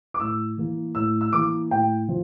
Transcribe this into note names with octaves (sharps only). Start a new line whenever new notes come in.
D6
A2 E6
E3 A#3
A2 E6
E6
E3 A#3 D6
A2 G5
F3